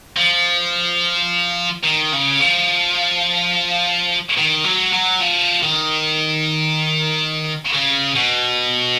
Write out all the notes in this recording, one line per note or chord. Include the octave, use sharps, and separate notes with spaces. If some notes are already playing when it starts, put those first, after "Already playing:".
F3
D#3
C#3
F3
D#3
F#3
F#3
F3
D#3
C#3
B2